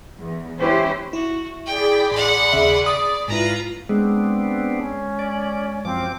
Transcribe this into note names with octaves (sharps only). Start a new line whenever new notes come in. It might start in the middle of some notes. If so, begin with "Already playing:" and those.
E2
C#4 E4 G4 B4 C5
E4 F#4
G#4 D5 G5 B5
A1 F#5 C6
D#2 C#3 E5
D5 D#6
G#2 E4 F4 B4 A#5
G#3 B3 C4 D4
C#4
D5
F#2 F3 C4 D6